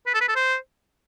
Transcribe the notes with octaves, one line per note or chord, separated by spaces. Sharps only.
B4
A4
B4
A4
C5